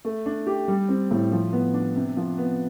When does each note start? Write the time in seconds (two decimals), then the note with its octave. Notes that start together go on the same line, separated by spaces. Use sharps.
0.05 A3
0.26 D4
0.47 G4
0.68 G3
0.89 C4
1.11 A2
1.32 F3
1.53 B3
1.74 D4
1.96 C3
2.17 F3
2.38 B3